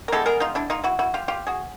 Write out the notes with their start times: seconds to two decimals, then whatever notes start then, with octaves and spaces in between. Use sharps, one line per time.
0.08 A#4
0.12 E3 G#3 B3 G4 A4
0.26 G#4 A#4
0.40 D#4 F4
0.55 D4 E4
0.70 D#4 F4
0.84 E4 F#4
0.99 E4 F#4
1.14 F4 G4
1.28 F4 G4
1.47 F#4 G#4